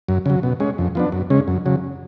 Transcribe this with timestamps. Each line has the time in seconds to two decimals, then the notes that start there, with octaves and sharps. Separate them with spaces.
0.08 F#2
0.26 C#3 F#3
0.43 B2
0.60 G#3 C#4
0.78 F2
0.95 F3 B3 D4
1.12 F#2
1.30 C#3 G#3 C#4
1.48 F#2
1.65 C#3 F#3